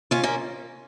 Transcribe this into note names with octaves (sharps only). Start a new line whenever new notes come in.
C#4 F4
A#3 C#4